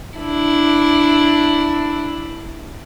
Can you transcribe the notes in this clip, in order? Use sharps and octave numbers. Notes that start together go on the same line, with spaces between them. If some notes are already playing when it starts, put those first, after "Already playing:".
D4 E4